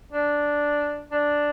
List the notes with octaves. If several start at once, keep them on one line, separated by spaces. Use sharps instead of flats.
D4
D4